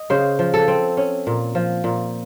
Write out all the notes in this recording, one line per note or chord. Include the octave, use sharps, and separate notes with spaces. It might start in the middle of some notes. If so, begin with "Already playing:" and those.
Already playing: D#5
C#3 C5
F3
A4
C4
C#4
A#2
F3
A#2